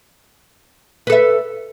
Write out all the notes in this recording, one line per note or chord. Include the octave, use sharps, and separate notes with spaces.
A4 B4 E5